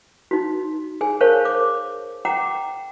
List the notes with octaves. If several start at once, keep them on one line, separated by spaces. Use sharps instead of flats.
D#4 F#4
G#4 G#5
A#4 C5 C#5 F5 A5 C#6
D6
F#5 G5 A#5 D6